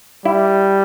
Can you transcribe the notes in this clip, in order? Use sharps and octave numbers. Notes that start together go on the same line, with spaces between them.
G3 E4